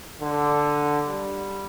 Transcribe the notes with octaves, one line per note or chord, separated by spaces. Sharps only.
D3
G3